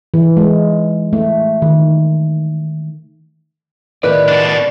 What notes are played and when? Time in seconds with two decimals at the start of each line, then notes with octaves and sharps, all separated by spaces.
0.14 E3
0.37 G#3
1.13 A3
1.62 D#3
4.03 A2 D#3 G3 B4 D5
4.28 B2 D4